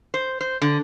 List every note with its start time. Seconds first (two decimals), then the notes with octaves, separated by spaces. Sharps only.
0.14 C5
0.41 C5
0.62 D3